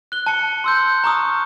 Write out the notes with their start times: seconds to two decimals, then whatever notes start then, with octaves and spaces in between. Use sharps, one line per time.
0.12 F#6 G7
0.26 A5 C#7
0.64 C6 E6 G6
1.04 A#5 C#6 D#6 F6